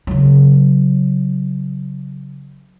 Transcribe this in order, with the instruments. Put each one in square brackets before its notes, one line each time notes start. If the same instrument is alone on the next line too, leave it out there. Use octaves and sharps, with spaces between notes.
[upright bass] C#3 F#3